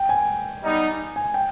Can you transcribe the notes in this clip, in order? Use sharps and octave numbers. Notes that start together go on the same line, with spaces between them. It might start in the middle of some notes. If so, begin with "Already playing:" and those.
Already playing: G5
G#5
G3 B3 D#4
G#5
G5